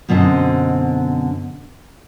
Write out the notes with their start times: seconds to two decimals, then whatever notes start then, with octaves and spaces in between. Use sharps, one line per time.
0.09 F#2 B2 D3 C4 D#5